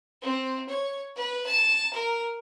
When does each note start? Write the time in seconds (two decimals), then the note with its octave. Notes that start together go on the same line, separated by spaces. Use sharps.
0.22 C4
0.68 C#5
1.16 B4
1.46 A5
1.93 A#4